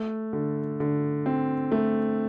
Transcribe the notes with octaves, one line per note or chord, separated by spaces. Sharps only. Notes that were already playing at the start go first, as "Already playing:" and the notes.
Already playing: A3
D3
D3
C4
A3